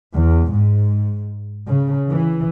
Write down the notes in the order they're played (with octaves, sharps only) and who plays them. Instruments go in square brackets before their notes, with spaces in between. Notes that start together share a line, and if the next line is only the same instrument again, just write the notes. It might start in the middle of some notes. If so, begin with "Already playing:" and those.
[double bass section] E2
G#2
C#3
E3